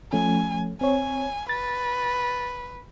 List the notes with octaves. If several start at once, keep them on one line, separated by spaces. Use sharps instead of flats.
F3 A3 C#4 G#5
C4 C#5 G#5
B4 A6